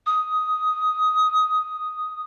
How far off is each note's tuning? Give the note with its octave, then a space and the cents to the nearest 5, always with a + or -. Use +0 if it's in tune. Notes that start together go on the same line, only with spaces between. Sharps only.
D#6 +10